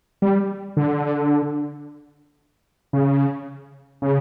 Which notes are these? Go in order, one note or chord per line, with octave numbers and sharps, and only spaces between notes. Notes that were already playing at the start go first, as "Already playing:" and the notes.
G3
D3
C#3
C#3